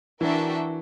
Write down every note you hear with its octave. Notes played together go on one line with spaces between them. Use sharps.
E3 D4 F#4 A#4 E5 G5